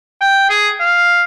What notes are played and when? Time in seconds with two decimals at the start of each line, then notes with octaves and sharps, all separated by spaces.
0.21 G5
0.49 G#4
0.80 F5